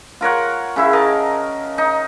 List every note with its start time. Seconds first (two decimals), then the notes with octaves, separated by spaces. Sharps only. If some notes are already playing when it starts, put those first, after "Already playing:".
0.21 F4 A#4 C#5 F#5
0.76 C#3 E4 E5
0.93 A#4 D#5 A5
1.78 D#4